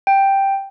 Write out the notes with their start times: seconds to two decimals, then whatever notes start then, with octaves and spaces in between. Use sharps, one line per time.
0.07 G5